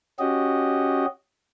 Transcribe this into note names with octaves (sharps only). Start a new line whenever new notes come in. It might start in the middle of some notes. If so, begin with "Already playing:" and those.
C#4 F#4 G4 D#5